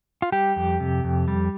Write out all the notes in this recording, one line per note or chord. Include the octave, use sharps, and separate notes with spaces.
F4
G3 G4
F2
C3
F2
G3